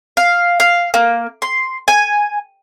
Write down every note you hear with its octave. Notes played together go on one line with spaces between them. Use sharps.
F5
F5
A#3
C6
G#5